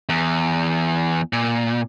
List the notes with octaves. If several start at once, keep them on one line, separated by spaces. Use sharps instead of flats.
E2
A#2